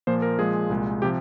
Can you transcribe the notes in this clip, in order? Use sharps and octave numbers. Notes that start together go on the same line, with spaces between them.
A#2 F3 A#3 C5
A#4
A#2 F3 G#3 G#4
C2 A#2 G#3
C3 F3 G4